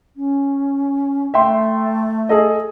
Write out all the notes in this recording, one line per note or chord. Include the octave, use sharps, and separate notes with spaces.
C#4
A3 E5 G5 C6
G#4 A4 D#5